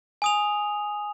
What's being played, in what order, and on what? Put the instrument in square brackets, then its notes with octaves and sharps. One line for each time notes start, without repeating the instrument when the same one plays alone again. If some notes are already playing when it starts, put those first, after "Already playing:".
[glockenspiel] G#5 D#6 F7